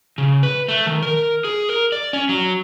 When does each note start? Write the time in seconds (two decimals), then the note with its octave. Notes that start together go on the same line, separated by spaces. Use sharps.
0.18 C#3
0.43 B4
0.68 A3
0.87 D#3
1.02 A#4
1.45 G#4
1.69 A#4
1.92 D5
2.13 C#4
2.29 F#3